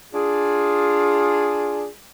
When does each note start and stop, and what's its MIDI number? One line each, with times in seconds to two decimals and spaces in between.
0.13 1.87 62
0.13 1.87 65
0.13 1.87 68